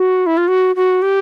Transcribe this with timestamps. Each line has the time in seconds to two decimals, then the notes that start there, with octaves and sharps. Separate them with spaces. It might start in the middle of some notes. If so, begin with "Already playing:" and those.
Already playing: F#4
0.26 E4
0.37 F4
0.48 F#4
0.76 F#4
1.02 G4